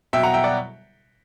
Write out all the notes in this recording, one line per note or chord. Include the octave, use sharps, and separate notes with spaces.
B2 F#3 E5 G5
F#5 A#5
E5 G5
D5 F#5